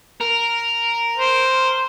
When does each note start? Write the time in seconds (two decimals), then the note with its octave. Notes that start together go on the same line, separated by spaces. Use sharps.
0.21 A#4
1.18 C5